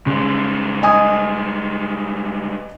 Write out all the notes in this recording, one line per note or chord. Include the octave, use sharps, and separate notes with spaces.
G2 C#3 G#3
D#5 G#5 D#6